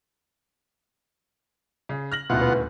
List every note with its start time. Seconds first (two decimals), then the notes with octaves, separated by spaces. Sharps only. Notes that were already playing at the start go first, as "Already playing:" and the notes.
1.89 C#3
2.12 F6 A#6 F#7
2.30 D#1 D2 B2 E4 F4 F#5
2.41 B4